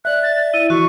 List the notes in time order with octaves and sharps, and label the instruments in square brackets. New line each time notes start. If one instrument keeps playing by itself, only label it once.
[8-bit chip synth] D5 E5 [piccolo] F#6
[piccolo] A6
[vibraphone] E4 [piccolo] D#7
[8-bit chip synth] E3 [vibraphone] F#4 [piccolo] C#6